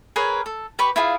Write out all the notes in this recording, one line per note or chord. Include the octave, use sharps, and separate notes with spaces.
G#4 A#4 B4 C#5
A4
G4 B4 B5 C#6
E4 F4 G#4 F5